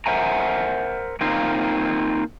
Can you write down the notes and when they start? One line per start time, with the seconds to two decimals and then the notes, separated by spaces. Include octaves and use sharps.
0.06 A#4 C5 E5 F#5 G#5 A#5
1.21 A#3 C4 D#4 F4